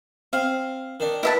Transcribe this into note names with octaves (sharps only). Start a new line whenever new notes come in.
C4 F5
D#3 D4
E4 B4 E5 A5